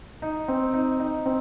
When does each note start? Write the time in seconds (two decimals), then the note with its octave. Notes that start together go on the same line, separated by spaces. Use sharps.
0.22 D#4
0.48 C4
0.74 D#4
1.00 D#4
1.26 C4